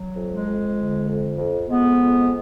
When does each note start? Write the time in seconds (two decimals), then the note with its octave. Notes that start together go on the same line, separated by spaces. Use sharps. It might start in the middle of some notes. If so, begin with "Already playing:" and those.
Already playing: F#3
0.14 F2
0.30 G#3
0.45 F2
0.76 D3
1.07 F2
1.38 F2
1.69 F2 G#3 B3
2.01 F2